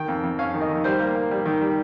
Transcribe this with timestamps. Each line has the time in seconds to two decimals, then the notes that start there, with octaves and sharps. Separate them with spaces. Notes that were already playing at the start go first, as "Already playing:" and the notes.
Already playing: D#3 G5
0.08 F2
0.24 F2
0.39 C#4 F5
0.54 D#3
0.61 D#5
0.69 D#3
0.84 G3 C5
1.00 A#3
1.16 A#3
1.31 G3
1.46 D#3
1.61 G3